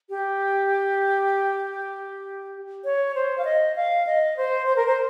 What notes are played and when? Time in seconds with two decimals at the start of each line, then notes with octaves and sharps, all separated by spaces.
0.10 G4
2.85 C#5
3.15 C5
3.38 F5
3.45 D#5
3.76 F5
4.07 D#5
4.37 C5
4.66 C5
4.76 A#4
4.87 C5